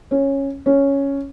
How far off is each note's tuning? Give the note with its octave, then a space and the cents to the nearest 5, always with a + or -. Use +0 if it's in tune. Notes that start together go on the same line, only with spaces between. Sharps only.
C#4 -10
C#4 +0